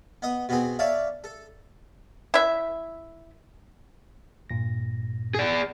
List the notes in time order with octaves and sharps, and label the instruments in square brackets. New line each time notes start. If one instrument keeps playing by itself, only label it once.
[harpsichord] B3 D#5
B2 B3 C4 G#4
C#5 D5 E5 F5 A5
A4
[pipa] E4 E5
[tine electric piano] G2 A#2 A#6
[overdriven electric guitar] G#4 D5